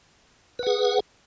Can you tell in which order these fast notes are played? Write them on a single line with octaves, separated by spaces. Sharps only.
B4 F#5 G#4